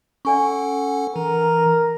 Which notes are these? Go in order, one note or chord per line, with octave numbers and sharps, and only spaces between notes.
C#4 A4 D5 F#5 G#5 C#6
E3 A#4